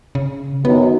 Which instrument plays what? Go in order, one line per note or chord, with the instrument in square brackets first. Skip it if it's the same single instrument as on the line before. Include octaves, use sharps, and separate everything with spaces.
[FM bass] C#3
[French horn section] F#2 D#3 F#3 [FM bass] B3